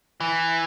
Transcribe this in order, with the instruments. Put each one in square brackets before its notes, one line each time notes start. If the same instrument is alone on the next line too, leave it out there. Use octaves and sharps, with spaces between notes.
[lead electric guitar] E3